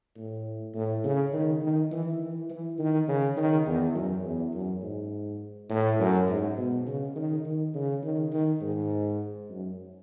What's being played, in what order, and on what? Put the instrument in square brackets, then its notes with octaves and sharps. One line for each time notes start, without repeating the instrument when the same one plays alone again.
[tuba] A2
A2
C#3
D#3
D#3
E3
E3
E3
D#3
C#3
D#3
E2
F#2
E2
F#2
G#2
A2
F#2
G#2
B2
C#3
D#3
D#3
C#3
D#3
D#3
G#2
F#2